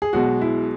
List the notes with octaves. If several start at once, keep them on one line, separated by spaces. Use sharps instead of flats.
G#4
B1 B2 G#3 F#4
E4